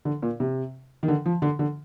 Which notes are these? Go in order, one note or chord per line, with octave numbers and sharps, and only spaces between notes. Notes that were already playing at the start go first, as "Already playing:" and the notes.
D3
A#2
C3
D#3
D3
F3
D3
D3